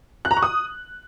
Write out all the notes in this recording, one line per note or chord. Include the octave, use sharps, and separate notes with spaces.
F#6
A#5
C#6
D#6